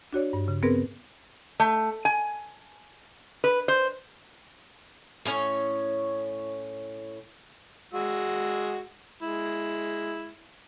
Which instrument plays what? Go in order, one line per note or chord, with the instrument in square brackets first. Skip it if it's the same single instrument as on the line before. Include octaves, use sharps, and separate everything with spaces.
[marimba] D4 F#4 C#5 D5
G2
C#3
B3 C4 G#4 A#4 B4
[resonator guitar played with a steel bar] A3
G#5
B4
C5
[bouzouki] A2 C#4 C#5
[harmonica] G#3 F#4 E6
G#3 E4